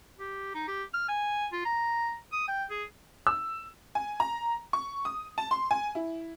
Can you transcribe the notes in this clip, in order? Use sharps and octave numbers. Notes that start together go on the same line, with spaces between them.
G4
D#4
G4
F6
G#5
F4
A#5
D#6
G5
G#4
E6
G#5
A#5
C#6
D#6
A5
C6
G#5
E4